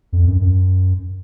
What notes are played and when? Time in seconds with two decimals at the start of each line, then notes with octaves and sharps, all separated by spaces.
0.13 F2
0.27 F#2
0.41 F#2